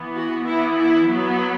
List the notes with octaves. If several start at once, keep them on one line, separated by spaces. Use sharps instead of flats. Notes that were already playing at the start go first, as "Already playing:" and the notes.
Already playing: E3 B3
F#4
E3 B3 E4
E4
F#3 B3